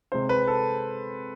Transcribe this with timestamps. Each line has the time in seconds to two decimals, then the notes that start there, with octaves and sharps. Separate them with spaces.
0.12 C3 G#3 C4 C5
0.29 B4
0.47 A4